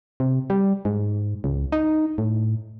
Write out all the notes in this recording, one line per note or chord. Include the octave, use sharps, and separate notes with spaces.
C3
G3
G#2
C#2
D#4
A2